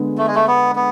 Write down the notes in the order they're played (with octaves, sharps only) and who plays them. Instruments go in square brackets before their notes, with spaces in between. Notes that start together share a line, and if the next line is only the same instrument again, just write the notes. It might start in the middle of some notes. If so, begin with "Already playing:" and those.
Already playing: [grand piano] D3 G#3 B3
[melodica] A3
G#3
A3
B3
B3